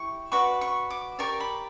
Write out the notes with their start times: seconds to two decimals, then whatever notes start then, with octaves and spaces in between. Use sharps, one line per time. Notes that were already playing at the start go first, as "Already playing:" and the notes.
Already playing: E4 G4 C#6
0.32 F#4 B4 D5 C#6
0.61 C#6
0.90 D6
1.19 G4 A#4 D5 C#6
1.40 B5